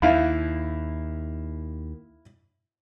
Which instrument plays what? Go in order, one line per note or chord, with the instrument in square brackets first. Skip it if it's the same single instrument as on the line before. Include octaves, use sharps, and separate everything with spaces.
[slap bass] D#2 [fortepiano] E4 F5